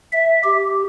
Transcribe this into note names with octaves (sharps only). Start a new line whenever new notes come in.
E5
G4